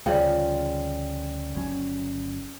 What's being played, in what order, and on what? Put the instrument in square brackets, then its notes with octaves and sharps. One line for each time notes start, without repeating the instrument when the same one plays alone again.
[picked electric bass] D2 G3 [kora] C#3 F3 [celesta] D5 G5
[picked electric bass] G1 F#3 C#4